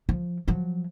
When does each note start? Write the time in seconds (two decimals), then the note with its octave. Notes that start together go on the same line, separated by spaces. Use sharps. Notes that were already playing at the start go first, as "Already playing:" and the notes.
0.09 F3
0.48 F3 F#3